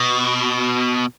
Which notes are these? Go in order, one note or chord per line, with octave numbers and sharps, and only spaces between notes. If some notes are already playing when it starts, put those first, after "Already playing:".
Already playing: B2